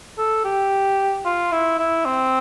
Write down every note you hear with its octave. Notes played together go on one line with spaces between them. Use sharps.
A4
G4
F4
E4
E4
C4